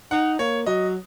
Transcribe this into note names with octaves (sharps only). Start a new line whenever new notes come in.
D#4 F#5
A#3 C#5
F#3 D#5